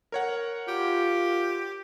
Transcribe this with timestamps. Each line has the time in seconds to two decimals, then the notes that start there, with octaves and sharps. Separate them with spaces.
0.12 A#4 C#5 F#5
0.68 F4 G4